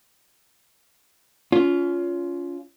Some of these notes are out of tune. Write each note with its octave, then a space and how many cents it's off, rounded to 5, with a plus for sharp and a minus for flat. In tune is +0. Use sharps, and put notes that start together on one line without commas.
C#4 +30 F4 +0